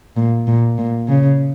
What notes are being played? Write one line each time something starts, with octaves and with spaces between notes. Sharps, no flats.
A#2
A#2
A#2
C#3